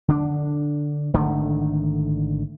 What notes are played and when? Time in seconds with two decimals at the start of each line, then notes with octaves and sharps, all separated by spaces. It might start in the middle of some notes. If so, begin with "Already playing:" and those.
0.08 D3 D4
1.13 G#1 D3 D#3 A3